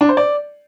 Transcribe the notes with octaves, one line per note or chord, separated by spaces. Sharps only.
D4
C5
D5